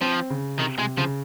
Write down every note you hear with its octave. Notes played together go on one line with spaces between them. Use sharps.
F3 C4
C#3
C3 D#3
C3 G#3
C#3 F3